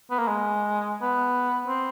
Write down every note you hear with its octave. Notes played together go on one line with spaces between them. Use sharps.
B3
A#3
G#3
B3
C4